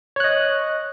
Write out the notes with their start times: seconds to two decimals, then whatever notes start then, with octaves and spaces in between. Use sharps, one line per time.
0.16 C#5
0.20 F#6
0.24 D#5